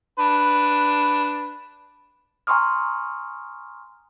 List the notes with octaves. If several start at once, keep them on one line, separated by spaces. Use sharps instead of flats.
D4 B4
G#5 A#5 C6 C#6 D#6 F6